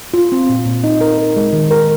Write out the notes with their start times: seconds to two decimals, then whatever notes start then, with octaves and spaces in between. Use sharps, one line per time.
0.14 F4
0.32 C4
0.49 A#2
0.66 A#2
0.84 D#4
1.01 A#4
1.18 A#4
1.36 G#3
1.53 D#3
1.71 A#4